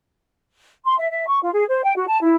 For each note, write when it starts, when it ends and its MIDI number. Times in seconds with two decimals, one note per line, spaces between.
0.84 0.95 84
0.98 1.10 76
1.10 1.27 76
1.27 1.39 85
1.42 1.50 65
1.54 1.65 68
1.69 1.83 72
1.83 1.92 79
1.96 2.04 66
2.08 2.18 81
2.23 2.35 64